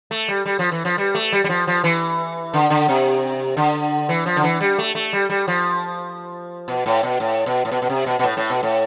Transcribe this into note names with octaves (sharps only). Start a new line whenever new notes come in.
A3
G3
G3
F3
E3
F3
G3
A3
G3
G3
F3
F3
E3
D3
D3
C3
D3
E3
F3
D3
E3
G3
A3
A3
G3
G3
F3
B2
A2
B2
A2
B2
A2
B2
B2
C3
B2
B2
A2
A2
B2
A2